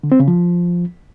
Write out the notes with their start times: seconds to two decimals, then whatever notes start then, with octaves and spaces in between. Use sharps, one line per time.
0.03 D3
0.12 C4
0.20 C#3
0.28 F3